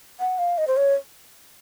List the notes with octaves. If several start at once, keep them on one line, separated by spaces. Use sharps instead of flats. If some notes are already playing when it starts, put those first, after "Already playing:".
F#5
F5
D#5
C5
C#5